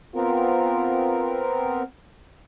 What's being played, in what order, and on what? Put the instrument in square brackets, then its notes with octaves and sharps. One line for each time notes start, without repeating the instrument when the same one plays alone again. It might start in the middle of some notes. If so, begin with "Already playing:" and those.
[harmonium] B3 C4 A#4 [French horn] F4